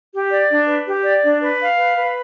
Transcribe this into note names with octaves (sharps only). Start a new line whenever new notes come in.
G4
D5
D4
B4
G4
D5
D4
B4
F5
B4
B4